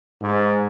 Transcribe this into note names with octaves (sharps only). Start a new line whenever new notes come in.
G#2